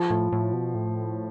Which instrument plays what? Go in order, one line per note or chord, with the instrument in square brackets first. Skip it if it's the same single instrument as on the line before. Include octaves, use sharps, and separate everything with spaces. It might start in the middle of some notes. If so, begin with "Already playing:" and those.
Already playing: [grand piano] F3
[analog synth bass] A2
A2
B2
A2